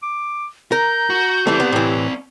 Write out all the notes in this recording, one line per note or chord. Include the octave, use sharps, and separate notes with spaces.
D6
A#4 A#5 G6
F#4
E3 A3 C4 G4 D5
B3
A2 E3